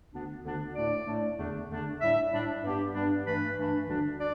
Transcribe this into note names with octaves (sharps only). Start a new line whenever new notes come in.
D2 D3 B3 D4
D2 D3 B3 D4
A2 A3 D4 D5
A2 A3 D4
E2 D3 A3 D4
E2 D3 A3 D4
A2 G3 D4 E5
A2 G3 D4
G2 G3 B3 D4 G4
G2 G3 B3 D4
G2 E3 A3 D4 B4
G2 E3 A3 D4
D2 D3 G3 D4
D4 D5